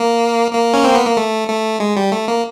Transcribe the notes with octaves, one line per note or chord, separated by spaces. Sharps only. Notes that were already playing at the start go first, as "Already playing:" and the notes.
Already playing: A#3
A#3
C#4
C4
B3
A#3
A3
A3
G#3
G3
A3
A#3